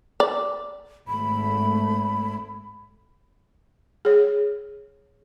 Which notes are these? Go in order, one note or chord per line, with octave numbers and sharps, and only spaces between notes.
D5
G#1 A3 B5
G#4 C#5